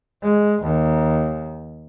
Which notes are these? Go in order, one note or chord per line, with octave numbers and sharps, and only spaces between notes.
G#3
D#2